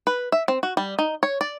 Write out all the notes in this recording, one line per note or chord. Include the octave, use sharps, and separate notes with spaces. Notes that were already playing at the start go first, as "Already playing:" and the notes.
B4
E5
C4
F#4
G3
D#4
C#5
D5